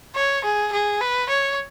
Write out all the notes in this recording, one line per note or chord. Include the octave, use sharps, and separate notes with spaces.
C#5
G#4
G#4
B4
C#5